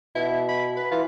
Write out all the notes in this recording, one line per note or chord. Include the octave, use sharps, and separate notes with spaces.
B2 E4
B5
B4
E3 F4